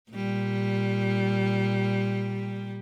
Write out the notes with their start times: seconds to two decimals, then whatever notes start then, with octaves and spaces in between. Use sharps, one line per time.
0.11 A#2 G3